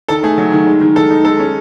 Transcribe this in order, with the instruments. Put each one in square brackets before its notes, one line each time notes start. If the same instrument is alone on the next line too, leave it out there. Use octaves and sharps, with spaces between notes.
[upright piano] D#3 A4
A3 G#4
F#3
D#3
G#3
D#3
D#3 A4
D#4
G#3 A4
C#4